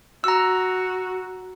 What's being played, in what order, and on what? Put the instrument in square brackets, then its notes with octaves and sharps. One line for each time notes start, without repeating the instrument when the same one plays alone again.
[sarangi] F#4 [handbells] A#5 E6